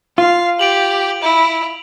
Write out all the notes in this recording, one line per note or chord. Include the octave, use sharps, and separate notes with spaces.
F4 F5
G4 D7 F7 F#7
E4